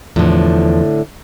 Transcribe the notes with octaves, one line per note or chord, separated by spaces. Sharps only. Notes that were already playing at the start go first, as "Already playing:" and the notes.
E2 A2 D3 F3